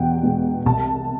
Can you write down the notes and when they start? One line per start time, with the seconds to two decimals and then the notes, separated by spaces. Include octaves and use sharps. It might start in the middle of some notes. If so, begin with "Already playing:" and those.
Already playing: E2 B2 B3 F#5 G5
0.23 B2 G#3 B3
0.66 C2 A5